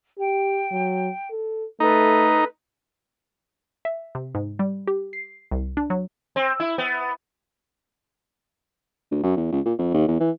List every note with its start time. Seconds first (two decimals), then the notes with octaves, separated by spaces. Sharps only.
0.18 G4 G5
0.72 F#3
1.30 A4
1.80 A3 D#4 A4 B4
3.85 E5
4.15 C3
4.35 G#2
4.59 G3
4.87 G4
5.13 C7
5.51 C2
5.77 D4
5.90 F#3
6.36 C4
6.60 E4
6.78 B3
9.11 D2
9.23 F#2
9.36 E2
9.52 C#2
9.65 A#2
9.78 F2
9.94 D#2
10.08 E2
10.20 E3